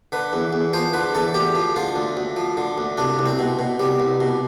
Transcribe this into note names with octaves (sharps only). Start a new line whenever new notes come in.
D3 B4
E2
E2
F3 C5
D3 B4
E2 A4
D2 G4
F3
D3 F4
D2
D2
F3
D3
D2
C2 D4
C2
C4
B2
B2
C2 G3
C2
B2